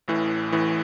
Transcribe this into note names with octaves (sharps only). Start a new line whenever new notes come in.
A1 A2 E3
A1 A2 E3